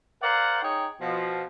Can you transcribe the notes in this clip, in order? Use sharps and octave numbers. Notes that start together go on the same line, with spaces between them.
A#4 C5 D5 F5 F#5
D#4 G#4 C#5 G5
B2 F3